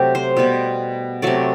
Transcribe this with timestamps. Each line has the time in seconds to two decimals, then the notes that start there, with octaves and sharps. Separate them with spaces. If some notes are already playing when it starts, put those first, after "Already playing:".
Already playing: C3 F#3 A3 G4
0.15 C5
0.37 B2 G3 B3
1.22 C3 F#3 A3 D5